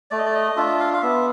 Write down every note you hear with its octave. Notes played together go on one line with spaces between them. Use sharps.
A3 D5
D#5
D5
D#5
D4 F4 E5
F5
F5
B3 E5